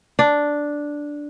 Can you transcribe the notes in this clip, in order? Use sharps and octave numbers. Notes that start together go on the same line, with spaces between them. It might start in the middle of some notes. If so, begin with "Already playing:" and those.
D4